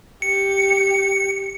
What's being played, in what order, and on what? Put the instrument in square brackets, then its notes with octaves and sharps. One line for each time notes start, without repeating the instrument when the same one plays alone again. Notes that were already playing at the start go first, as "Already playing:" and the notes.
[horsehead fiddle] G4 [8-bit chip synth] C#7